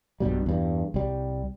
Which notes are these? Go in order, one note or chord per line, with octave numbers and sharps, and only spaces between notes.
B1 G2 B2 G3
E2 G2
C2 G3